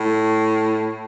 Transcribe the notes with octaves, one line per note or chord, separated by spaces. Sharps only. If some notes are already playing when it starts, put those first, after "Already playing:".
Already playing: A2